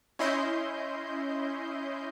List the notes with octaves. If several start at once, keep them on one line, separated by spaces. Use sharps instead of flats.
C#4 E4 D#5 C6 G6